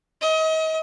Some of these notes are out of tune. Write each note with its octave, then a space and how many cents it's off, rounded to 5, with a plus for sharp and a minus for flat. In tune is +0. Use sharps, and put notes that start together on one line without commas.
D#5 +35